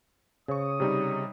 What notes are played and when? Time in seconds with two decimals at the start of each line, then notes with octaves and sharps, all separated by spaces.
0.48 C#3 C5 C#5 C#6 D#6
0.80 C3 G3 D#4